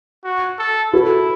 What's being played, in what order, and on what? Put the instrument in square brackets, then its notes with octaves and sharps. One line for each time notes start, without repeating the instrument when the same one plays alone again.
[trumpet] F#4
A4
[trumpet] E4 [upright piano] F#4 A4